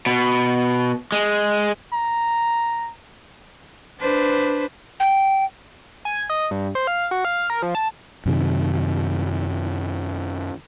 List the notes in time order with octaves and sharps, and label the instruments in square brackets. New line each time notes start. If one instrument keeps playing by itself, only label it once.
[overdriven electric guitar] B2
G#3
[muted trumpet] A#5
[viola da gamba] D4 B4 C5
[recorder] G5
[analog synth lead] G#5
D#5
G2
C5
F5
F#4
F5
A#4
F3
A5
[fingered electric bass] F#2 C3 D#3